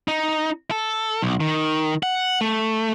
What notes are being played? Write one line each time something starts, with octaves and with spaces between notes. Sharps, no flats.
D#4
A4
B1
D#3
F#5
A3